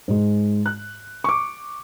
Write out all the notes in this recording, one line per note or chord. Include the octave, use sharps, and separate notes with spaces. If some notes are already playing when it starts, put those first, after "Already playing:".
G#2 G#3
F#6
C#6 D6